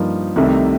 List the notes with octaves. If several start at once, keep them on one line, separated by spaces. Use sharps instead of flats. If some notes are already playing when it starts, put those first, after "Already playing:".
Already playing: G2 F3 A#3 D#4
C2 C3 D#3 A3